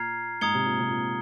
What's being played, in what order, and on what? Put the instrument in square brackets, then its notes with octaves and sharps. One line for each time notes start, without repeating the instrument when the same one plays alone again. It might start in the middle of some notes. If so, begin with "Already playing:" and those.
Already playing: [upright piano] A#2 [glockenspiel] A#5 F6 G#6 C7
[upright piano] G#2 [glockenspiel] A#5 D#6 G#6 C#7 G7
[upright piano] C3
A#2
C3
A#2